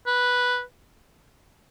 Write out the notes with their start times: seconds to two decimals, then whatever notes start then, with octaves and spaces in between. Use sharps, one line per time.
0.07 B4